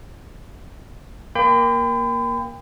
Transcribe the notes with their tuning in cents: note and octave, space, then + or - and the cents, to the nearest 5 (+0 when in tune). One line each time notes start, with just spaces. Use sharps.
A#3 +15 G5 +25 B5 +45